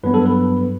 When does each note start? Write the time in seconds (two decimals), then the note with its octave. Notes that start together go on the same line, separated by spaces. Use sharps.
0.03 G2 F#3 B3 B4
0.14 A4
0.25 B4